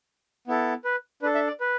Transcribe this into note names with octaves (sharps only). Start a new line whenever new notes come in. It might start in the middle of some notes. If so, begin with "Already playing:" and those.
B3 E4 A4
B4
D4 A4 B4
E5
D5
B4